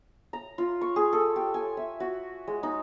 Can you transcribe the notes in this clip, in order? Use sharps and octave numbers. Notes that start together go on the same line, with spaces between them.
A#5
F4
C#6
G#4
A4
G4
G#5
E5
F#4
G#3
D#4